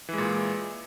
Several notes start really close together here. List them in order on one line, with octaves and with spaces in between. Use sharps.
E3 G#3 A#2